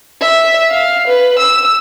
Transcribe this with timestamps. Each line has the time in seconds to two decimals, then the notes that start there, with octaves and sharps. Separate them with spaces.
0.21 E5
0.71 F5
1.07 B4
1.38 E6